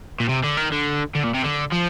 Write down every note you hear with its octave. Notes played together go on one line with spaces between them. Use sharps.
A#2
C3
D3
D#3
D3
D3
A#2
C3
D3
F3